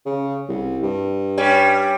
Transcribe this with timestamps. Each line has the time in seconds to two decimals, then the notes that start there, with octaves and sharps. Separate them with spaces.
0.06 C#3
0.49 C2
0.83 G2
1.38 G3 C#4